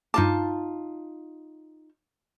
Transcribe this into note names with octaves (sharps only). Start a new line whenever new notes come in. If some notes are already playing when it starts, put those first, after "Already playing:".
G2 D#4 F4 A5 D6